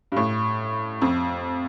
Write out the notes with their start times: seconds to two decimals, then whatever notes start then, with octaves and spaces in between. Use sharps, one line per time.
0.12 G2
0.16 A2
1.02 F2